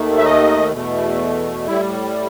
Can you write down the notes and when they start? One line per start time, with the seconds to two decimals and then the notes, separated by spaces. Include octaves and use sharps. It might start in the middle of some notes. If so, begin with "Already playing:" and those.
Already playing: D#2 D#3 A3
0.18 E5
0.25 D#5
0.73 E2 B2 A3
1.67 A2 G3 E4